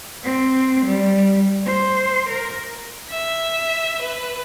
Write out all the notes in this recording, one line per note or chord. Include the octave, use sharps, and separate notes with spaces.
C4
G3
C5
A#4
E5
B4